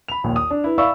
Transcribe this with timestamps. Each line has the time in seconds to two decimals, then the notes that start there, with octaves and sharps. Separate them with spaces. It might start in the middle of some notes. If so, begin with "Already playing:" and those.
0.08 B5 F7
0.24 A#1 D#2
0.36 D#6
0.51 D4
0.64 E4 B4
0.78 D5 E5 F5 B5 C#6 E6